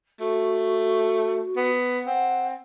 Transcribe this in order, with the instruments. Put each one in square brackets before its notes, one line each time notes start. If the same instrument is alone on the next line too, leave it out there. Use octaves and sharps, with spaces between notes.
[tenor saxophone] A3 [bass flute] F#4
[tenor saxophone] B3
[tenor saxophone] C4 [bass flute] F#5